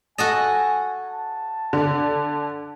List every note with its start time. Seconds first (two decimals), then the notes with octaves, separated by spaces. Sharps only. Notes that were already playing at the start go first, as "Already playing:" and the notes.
0.18 F#4 A4 D#5 G#5
1.09 A5
1.73 D3